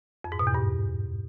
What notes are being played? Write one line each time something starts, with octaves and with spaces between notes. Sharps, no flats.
F2
G#2
B2
E2
G2